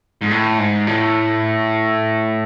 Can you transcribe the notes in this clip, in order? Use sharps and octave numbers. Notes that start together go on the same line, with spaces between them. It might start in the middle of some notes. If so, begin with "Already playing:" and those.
G#2
A2
G#2
A2